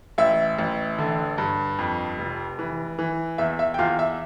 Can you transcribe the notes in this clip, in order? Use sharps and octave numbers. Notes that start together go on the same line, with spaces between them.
A1 E5
A1
D3
G2
F2
F1
E3
E3
E2 E5
E5
G5
E2 F4 F5
E5